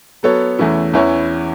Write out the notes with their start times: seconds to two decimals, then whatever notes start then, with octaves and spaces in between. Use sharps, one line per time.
0.23 F#3 B3 A4 C#5
0.59 E2 E3 A3 C#4 E4
0.93 E2 E3 C#4 E4 C#5